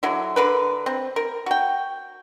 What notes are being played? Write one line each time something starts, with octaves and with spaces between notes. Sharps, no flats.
D3 F#3 E4
D3 A#4 B4
C4
A#4
F#4 G5